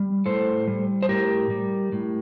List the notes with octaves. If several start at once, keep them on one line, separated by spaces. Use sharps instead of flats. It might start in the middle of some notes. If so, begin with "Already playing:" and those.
Already playing: G3
A2 A4 C5
G3
C5
A2 G4 A#4
G3
A2